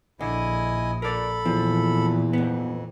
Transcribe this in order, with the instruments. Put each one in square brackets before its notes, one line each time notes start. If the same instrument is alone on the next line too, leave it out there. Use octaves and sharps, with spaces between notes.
[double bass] A#1 [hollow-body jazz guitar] D3 [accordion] E4 D#5 G#5
[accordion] A4 B5 [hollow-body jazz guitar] A#4 D5
[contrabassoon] E2 [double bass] A#2 E3 [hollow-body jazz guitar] F3
[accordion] F2 [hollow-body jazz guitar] G#2 B3